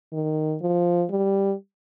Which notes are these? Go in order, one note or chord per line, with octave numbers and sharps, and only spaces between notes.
D#3
F3
G3